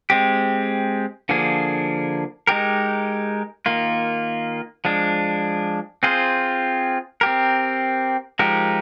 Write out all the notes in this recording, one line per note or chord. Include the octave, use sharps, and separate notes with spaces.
G#3 C4 G4
D3 F3 A#3 D4 G#4
G#3 D#4 G4 A#4
D#3 A#3 F4
F3 G#3 D4
C4 F4 G#4 C5
C4 G4 A#4
F3 G#3 D#4 G4 A#4